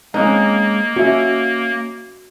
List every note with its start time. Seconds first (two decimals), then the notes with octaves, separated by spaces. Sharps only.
0.14 G#3 A#3 C4 C#4 D#4
0.96 C#4 F#4 E5